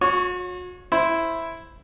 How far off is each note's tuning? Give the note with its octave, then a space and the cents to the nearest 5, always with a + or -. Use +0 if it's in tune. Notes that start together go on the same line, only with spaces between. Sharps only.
F#4 -40 C#5 +0 C#6 +0
E4 +0 C5 +0